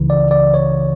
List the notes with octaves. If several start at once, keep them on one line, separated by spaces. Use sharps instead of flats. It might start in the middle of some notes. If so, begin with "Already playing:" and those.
Already playing: C#2 C#3 E3
D5
D5
C#5